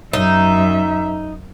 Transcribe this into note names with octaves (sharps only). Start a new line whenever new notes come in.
F#2 D#4 E5